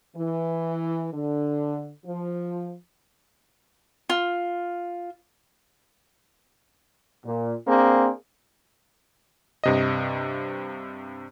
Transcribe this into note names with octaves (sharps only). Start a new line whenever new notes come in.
E3
D3
F3
F4
A#2
A#3 C4 D4 G#4
G2 C3 D#5